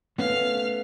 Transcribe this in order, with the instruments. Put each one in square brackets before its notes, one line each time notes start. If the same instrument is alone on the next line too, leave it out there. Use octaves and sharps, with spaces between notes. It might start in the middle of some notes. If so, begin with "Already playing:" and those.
[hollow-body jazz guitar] A3 B3 C#4 [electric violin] F5 F6